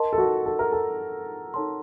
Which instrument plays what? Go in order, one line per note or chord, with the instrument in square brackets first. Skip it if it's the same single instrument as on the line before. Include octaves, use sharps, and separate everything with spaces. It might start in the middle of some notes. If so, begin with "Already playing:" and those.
Already playing: [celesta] A#4 D#5 A5 C6
[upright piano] A4
F#4
A4
A#4
A4
[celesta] D#4 A4 C#5 A5 C6